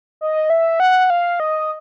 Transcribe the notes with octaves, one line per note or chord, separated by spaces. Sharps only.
D#5
E5
F#5
F5
D#5